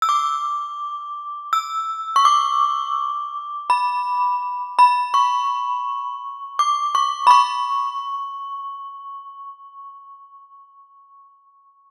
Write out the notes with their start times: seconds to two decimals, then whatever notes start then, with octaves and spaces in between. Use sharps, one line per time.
0.02 E6
0.09 D6
1.53 E6
2.16 C#6
2.25 D6
3.70 B5
4.79 B5
5.14 C#6
6.59 D6
6.95 C#6
7.27 B5
7.31 C#6